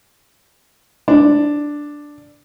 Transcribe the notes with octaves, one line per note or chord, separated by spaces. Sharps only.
D4